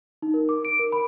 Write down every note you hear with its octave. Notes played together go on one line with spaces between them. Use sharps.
D#4
A#4
D6
D7
A#4
B5